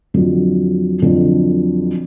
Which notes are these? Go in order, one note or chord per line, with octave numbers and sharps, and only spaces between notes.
F2 D3 F#3
F2 D3 F#3